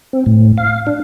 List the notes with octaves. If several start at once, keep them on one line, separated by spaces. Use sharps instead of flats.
C4
A2
F5
D4